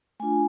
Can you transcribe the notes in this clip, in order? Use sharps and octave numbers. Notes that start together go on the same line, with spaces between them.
A3 D4 F4 G#5